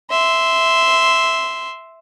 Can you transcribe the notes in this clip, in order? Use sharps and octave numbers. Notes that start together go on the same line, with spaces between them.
E5 C6